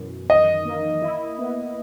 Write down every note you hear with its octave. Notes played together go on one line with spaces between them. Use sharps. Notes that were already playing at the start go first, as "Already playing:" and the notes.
Already playing: F#2 B2 E3
D#3 D#5
A#3
E4
B3